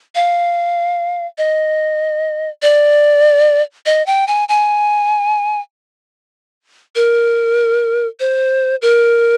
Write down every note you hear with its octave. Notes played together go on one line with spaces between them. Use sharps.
F5
D#5
D5
D#5
G5
G#5
G#5
A#4
C5
A#4